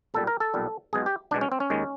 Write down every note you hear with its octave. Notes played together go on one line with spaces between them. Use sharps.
B1 A#2 G3 A4
A#4
A4
B1 A#2 G3
B1 B2 G#3 G#4
G4
B1 B2 G#3 D4
C#4
C4
C#4
D#2 D#3 G#3